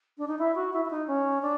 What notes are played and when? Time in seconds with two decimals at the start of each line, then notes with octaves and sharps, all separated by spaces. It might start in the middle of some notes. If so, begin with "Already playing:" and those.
0.18 D4
0.27 D#4
0.38 E4
0.55 F#4
0.73 E4
0.85 E4
0.90 D#4
1.07 C#4
1.42 D4